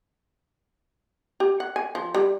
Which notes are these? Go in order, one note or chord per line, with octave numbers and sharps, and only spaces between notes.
G4
F#5
G#5
F3
G3